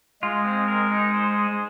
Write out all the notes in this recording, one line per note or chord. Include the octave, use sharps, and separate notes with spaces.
G#3 F4
C4
A#4
D#4
C5
G#4